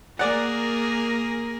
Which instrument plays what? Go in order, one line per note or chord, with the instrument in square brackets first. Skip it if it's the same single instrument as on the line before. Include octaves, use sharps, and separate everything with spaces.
[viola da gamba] A#3 G#4 A#4 [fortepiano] D5 F#5